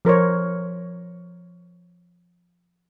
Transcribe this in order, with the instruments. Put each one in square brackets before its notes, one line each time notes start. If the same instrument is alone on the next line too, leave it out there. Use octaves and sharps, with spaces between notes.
[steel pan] F3 A#4 C5 C#5